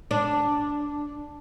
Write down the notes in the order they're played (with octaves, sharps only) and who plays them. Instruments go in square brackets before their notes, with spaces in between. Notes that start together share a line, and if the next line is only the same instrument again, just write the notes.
[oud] D4